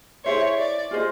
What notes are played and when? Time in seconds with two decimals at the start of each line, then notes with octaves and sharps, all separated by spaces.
0.25 E4 G#4 C5 C#5 E5
0.58 D5
0.91 F4 G#4 C5 D#5